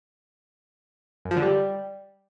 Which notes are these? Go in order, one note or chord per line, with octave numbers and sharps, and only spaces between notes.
F#2
F3
D3
G3